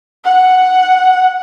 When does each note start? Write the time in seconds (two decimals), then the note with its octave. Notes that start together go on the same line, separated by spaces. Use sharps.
0.24 F#5